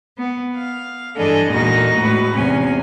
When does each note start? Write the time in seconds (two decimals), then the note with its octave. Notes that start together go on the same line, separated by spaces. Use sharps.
0.18 B3
0.56 F5
1.16 G2 E3 D4 G#4 A4 D#5
1.50 E2 A#2 G#3 D#4 F#4 A#6
1.98 A2 G#3 F#4 B4
2.35 E2 C3 C#4 G#5